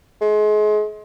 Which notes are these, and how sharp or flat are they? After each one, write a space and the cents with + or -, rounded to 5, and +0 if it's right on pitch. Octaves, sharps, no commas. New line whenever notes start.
G#3 +35